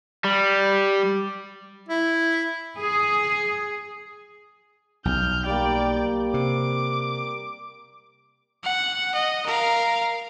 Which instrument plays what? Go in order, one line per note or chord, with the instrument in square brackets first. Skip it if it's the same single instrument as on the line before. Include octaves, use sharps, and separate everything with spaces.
[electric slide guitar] G3
[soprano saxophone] E4
[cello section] G#4
[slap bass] B1 [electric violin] F6 G6
[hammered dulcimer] G3 A#3 [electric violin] D5 G5
[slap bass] C3 [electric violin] D6
[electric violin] F#5
D#5
A#4 F5